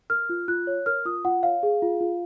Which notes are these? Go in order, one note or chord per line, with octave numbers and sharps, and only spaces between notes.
A#4 F6
F4
F4 F#6
C#5
A#4 F6
F4 D#6
F4 F#5
C#5 F5
G#4
F4
F4